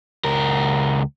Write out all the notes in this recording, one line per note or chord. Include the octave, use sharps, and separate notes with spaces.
C#2 A#4